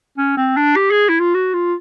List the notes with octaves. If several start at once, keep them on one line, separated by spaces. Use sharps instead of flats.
C#4
C4
D4
G4
G#4
E4
F4
F#4
F4